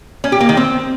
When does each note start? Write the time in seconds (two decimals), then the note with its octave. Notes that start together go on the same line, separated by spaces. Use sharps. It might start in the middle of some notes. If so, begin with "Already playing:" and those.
0.24 C#4
0.32 G4
0.40 A#3
0.49 D#3
0.57 C4